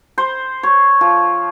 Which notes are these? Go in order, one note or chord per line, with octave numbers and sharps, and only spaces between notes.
C5
C#5
F3